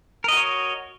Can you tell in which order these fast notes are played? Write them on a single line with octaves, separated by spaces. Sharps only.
A#4 D#5 F#4 C#5